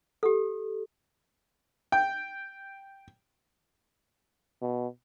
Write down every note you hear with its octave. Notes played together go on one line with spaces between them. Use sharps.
G4 A4
G5
B2